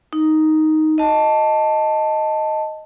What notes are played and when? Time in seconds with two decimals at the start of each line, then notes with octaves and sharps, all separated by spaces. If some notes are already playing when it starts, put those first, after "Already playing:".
0.13 D#4
0.98 D#5 A5